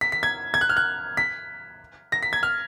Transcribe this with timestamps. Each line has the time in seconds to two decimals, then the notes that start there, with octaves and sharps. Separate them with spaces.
0.01 B6
0.12 B6
0.23 G#6
0.54 G#6
0.61 F#6
0.69 F6
0.77 F#6
1.17 B6
2.12 A#6
2.23 B6
2.33 G#6
2.43 F6